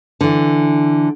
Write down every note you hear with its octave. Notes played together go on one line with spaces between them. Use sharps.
D3 E3